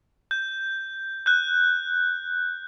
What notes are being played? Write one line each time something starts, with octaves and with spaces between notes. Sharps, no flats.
G6
F#6 G6